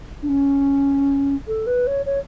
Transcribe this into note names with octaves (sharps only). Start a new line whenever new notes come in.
D4
C#4
A4
B4
C#5
C#5